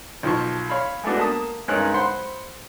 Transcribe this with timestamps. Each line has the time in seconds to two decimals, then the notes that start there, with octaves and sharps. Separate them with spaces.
0.23 B1 F3 A5 C#6
0.69 C#5 F5 B5
1.03 G#3 A3 B3 D4 F#4
1.17 A#3 A5 D#6
1.68 G2 G#3 C#4 D#4 A#4 F#6
1.94 C5 F#5 B5 C6